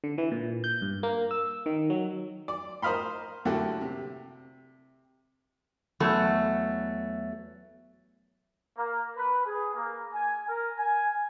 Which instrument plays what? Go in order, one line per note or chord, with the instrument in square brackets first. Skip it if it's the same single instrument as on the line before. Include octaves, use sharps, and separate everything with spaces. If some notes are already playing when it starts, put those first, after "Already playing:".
[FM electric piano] D3
E3
A#2
G6
G2
A#3
E6
D#3
F#3
[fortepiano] D5
A#4 C5 D#5 F5 B5 C6
A2 D3 A3 A#3 F#4 G4
C3
[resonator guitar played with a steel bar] E2 F#3 A3
[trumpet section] A#3
B4
G#4
A#3
G#5
A#4
G#5